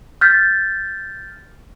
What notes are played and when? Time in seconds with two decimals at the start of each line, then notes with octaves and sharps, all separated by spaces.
0.21 F6 G6 A6 B6